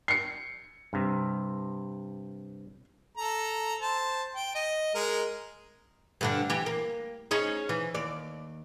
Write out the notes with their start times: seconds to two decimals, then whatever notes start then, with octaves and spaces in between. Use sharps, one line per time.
0.08 C7 C#7
0.93 G2 C3
3.17 A4 A#5
3.80 C5 A5
4.36 G5
4.55 D#5
4.95 G#3 A#4
6.21 G2 D3 D4
6.50 E3 G4
6.66 A#3
7.31 C#4 D#4 G#4
7.69 E3
7.95 D#2 D5